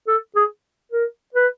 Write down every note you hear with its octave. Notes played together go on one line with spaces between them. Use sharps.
A4
G#4
A#4
B4